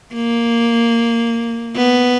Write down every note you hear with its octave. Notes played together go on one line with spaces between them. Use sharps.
A#3
B3